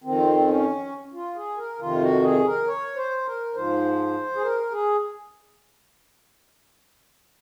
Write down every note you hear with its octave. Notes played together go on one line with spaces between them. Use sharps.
F2 D#3 C4
C#4
F4
G#4
A#4
F2 C3 D#3 F4
F#4
G#4
A#4
C#5
C5
A#4
G#2 F3 C5
G#4
A#4
G#4